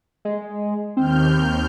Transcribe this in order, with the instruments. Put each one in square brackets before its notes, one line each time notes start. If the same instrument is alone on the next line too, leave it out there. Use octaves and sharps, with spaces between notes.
[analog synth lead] G#3
[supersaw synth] D#2 F6 G6 [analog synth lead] C4